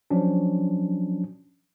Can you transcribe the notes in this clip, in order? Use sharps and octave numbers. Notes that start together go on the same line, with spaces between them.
F3 F#3 C#4 D4